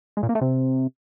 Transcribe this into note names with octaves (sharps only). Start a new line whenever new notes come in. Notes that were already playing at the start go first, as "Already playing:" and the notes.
G#3
A#2
A#3
A3
C3